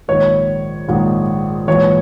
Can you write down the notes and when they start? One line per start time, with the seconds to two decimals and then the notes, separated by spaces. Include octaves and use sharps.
0.08 A#1 G#2 D#3 C#5
0.88 A#1 G#2 D#3
1.67 A#1 G#2 E3 C#5